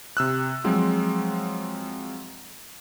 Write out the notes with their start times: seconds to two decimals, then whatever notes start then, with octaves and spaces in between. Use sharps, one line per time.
0.17 C3 E6 F#6
0.64 F3 F#3 G#3 C4